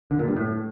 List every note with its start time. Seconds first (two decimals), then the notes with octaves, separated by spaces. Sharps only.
0.11 D3
0.19 A#2
0.28 G2
0.36 A2